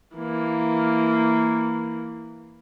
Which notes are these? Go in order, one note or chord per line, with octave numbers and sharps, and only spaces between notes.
E3 A#3